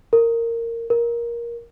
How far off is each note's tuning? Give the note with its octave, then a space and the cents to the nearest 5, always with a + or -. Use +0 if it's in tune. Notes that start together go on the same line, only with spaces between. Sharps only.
A#4 -15
A#4 +15